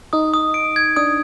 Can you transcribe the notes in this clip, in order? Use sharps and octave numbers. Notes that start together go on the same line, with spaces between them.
D#4 D#6
D#6
D7
G#6
D4 D#6